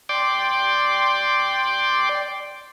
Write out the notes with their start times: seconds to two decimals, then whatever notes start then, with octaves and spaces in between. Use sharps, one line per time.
0.09 D5 G5 C6 D6